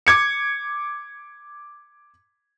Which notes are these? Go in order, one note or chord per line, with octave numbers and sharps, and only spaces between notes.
D6 G#6 C#7